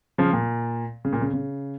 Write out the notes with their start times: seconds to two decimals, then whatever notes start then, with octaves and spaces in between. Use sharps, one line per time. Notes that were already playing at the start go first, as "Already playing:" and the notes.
0.18 C#3 F3
0.33 A#2
1.05 C#3
1.13 A#2
1.21 C#3
1.33 C#3